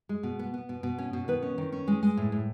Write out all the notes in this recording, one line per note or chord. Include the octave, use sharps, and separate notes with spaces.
G#3
B2
B3
B3
B2
B2
C#4
B2
D#3 B4
C#4
D#3
C#4
G#3
G#3
A2
A2